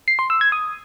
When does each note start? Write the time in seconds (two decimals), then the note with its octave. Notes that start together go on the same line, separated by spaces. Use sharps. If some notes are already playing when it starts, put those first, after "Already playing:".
0.08 C7
0.19 C6
0.30 E6
0.41 G#6
0.52 D#6